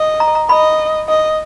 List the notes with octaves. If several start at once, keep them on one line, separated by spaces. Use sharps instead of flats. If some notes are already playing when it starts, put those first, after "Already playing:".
Already playing: D#5
A#5
A#5
D#5 B5
D#5